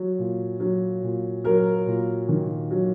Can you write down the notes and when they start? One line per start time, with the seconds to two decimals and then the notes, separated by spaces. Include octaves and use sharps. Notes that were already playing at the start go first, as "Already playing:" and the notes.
Already playing: F#3
0.19 A#2
0.60 F#3
1.03 A#2
1.44 F#3 A#4
1.86 A#2
2.29 D#3
2.71 F#3